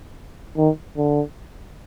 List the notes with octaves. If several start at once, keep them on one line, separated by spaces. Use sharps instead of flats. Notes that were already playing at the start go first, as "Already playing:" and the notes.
D#3
D3